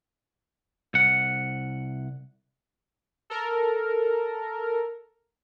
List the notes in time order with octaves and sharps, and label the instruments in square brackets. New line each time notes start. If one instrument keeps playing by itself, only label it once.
[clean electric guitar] C2 F#5
[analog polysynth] A4 A#4